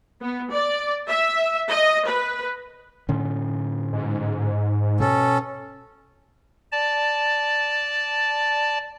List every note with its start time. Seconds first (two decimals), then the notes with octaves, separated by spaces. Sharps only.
0.21 B3
0.51 D5
1.07 E5
1.69 D#5
2.06 B4
3.08 A2 D3 C#4
3.93 G#2
5.00 B2 C#4 A4
6.72 D5 A5